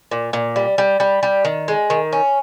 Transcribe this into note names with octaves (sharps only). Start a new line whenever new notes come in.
A#2
A#2
G3
G3
G3
G3
D#3
G#3
D#3
C#4